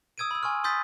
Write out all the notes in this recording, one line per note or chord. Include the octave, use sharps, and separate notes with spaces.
D#6 E6 G#6 D7 D#7
B5 E6
G#5 C6 C#6 F6
C6 D#6 G6 A6 B6